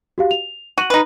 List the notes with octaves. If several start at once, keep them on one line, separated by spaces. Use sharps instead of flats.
F#4 G4 F5
F7
F#4 D#7 F#7
D#4 B4